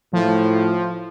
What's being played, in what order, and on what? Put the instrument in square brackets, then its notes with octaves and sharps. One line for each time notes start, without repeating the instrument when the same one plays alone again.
[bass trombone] A2 [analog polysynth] F3